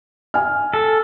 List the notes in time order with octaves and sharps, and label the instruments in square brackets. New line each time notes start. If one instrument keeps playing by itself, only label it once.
[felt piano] G#5 F6
[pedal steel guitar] A4